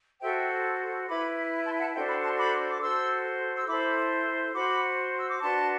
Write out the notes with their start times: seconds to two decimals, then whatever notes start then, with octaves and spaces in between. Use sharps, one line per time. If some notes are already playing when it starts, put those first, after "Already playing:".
0.21 F#4 A4 C5 E5 G5
1.08 E4 B4 B5 D6
1.65 A5 C6
1.80 F#5 A5
1.94 D4 F#4 A4 C5 E5 G5
2.09 G5 B5
2.24 A5 C6
2.38 B5 D6
2.70 D6
2.81 F#4 A4 C5 C6 E6
3.56 E6
3.67 E4 A4 C5 B5 D6
4.54 F#4 C5 B5 D6
5.18 E6
5.29 D6
5.41 D4 F#4 B4 A5 C6